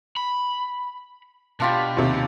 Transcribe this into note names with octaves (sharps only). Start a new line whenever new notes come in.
B5
B2 D4 F4 G4
D#2 C3